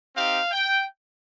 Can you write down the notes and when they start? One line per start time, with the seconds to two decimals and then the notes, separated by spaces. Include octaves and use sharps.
0.15 C4 D#4 G4 F5
0.52 G5